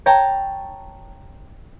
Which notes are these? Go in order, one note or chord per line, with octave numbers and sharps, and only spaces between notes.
C#5 G5 A5 A#5